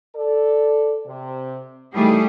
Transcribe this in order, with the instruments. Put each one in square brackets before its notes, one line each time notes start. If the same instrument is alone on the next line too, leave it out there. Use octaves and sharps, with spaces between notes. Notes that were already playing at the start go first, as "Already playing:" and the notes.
[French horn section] A4 D5
C3
[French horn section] A2 D#3 E3 [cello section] G3 A3 G#4